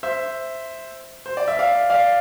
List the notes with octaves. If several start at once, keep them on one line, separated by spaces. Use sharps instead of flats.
C5 E5
C5
D5
E5
D5 F5
D5 F5